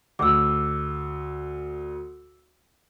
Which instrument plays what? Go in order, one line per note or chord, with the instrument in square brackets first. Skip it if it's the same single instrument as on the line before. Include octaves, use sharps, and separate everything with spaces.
[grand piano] D2 [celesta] D6 E6